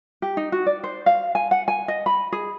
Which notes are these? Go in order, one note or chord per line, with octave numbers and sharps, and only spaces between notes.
G4
D#4
F#4
D5
C5
F5
G#5
F#5
G#5
D#5
B5
G#4